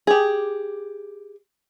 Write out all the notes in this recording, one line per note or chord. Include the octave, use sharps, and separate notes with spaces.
G4 G#4